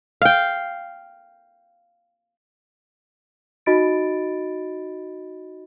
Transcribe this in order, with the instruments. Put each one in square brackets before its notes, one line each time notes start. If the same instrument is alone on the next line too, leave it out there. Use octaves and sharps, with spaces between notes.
[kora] F5 G5
[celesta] D#4 F#4 D#5 B5 A6 D7